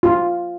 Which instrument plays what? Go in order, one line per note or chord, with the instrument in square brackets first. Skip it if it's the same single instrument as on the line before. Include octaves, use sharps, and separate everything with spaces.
[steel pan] F4